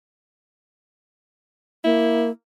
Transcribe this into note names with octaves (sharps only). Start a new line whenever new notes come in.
A#3 E4